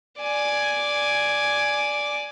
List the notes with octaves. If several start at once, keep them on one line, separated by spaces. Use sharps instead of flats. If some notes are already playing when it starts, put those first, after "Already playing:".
D5 G#5